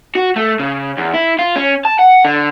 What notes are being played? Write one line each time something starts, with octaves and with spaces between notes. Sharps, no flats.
F#4
A3
C#3
E2
E4
F4
C#4
A5
F#5
D3